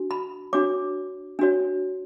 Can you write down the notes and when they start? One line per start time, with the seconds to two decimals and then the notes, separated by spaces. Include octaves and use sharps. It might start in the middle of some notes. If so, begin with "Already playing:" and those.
Already playing: D4 F#4
0.11 B5
0.53 D4 F#4 C#5 D6
1.39 D4 F#4 C#5